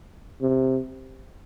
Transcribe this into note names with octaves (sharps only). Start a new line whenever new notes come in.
C3